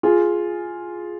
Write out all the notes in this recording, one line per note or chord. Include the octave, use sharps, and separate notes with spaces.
F4 G#4